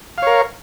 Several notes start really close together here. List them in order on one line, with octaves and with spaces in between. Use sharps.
F5 C#5 A#4